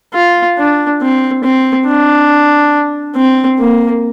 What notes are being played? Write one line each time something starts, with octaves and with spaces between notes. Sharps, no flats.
F4
D4
C4
C4
D4
C4
A#3